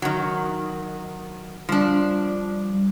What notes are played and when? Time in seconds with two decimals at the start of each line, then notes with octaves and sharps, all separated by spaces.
0.02 D#3 F#3
1.69 F3 G3 D4